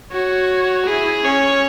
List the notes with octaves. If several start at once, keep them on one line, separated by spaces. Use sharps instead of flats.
F#4 C#5
E4 G#4
C#4 C#5